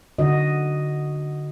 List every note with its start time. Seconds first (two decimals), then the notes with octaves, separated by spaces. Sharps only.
0.19 D3 F#4 D#5